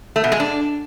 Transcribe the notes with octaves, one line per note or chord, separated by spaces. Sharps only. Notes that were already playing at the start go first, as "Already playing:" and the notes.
A3
B2
G#3
D4